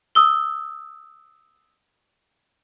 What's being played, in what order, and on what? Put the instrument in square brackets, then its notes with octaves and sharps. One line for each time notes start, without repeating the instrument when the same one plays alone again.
[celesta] D#6 E6 G7